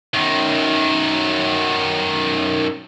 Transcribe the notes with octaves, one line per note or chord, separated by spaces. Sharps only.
F#2 D#3